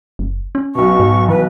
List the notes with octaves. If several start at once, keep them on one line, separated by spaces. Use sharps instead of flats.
F#1
C#4
B1 B2 C#6
G#2
E3 B4